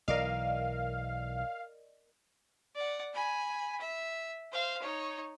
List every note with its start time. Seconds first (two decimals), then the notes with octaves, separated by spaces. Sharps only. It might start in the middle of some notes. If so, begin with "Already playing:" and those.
0.08 B1 E3 A#4 D5 D#5 F5
2.75 D5 F#5
3.14 G#5 B5
3.80 E5
4.52 C5 F5
4.82 D#4 C#5